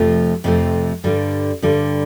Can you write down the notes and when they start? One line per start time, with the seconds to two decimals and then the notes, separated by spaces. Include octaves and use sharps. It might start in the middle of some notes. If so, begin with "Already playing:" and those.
Already playing: F2 C3 F3 A3 C4
0.44 F2 C3 F3 A3 C4
1.04 G2 D3 G3
1.62 G2 D3 G3